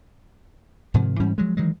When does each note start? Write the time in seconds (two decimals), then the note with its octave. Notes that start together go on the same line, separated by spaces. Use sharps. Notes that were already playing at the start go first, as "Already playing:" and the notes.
0.94 G#2 C3 D#3 F3
1.20 G#2 E3 G3 C#4
1.38 F3 F#3 G#3
1.57 D#3 E3 F#3 G#3